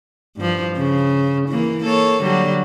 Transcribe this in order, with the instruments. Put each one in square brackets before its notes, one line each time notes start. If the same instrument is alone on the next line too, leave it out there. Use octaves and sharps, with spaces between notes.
[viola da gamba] G2 F3
C#3
E3 A#3
A#3 A4 C#5
D3 F#3 G3